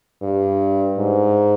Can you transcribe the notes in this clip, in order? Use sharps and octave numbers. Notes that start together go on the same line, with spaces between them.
G2
G#2